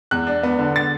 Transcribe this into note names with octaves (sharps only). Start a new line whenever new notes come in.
E2 F#6
D4
B3
D3
A6